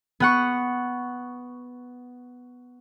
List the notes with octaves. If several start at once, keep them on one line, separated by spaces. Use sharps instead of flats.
B3 F#5 C#6